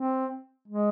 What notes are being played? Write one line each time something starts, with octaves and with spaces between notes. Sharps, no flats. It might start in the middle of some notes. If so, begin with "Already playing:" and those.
Already playing: C4
G#3